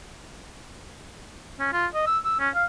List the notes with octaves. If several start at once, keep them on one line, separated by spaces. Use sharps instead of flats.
C#4
F4
D#5
E6
E6
C#4
F5